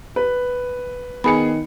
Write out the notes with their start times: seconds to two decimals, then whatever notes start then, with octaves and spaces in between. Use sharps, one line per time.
0.16 B4
1.24 D#3 B3 G#4 B5 C#7